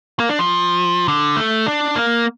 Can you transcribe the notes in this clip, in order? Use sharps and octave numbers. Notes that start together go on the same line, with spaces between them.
A#3
D4
F3
D3
A3
D4
A#3